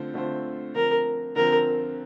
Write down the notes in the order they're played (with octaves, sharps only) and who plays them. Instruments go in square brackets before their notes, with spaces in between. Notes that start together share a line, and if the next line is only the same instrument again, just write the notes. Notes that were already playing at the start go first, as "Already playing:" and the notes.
Already playing: [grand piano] D3 A3 C4 F4 C5
D3 A3 C4 F4 C5
[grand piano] D3 F3 C4 [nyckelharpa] A#4
[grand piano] D3 F3 C4 [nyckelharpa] A#4